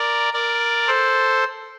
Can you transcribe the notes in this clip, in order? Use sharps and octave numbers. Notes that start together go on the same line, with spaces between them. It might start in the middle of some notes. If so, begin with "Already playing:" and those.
Already playing: A#4 D5
A#4 D5
A4 C5